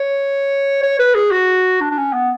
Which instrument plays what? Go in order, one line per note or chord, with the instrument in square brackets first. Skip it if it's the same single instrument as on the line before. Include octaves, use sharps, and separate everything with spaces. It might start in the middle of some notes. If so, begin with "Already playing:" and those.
Already playing: [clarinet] C#5
C#5
B4
G#4
F#4
D4
D4
C#4
B3